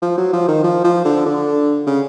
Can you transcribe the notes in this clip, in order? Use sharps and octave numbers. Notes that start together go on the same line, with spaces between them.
F3
F#3
F3
D#3
F3
F3
D3
D3
C#3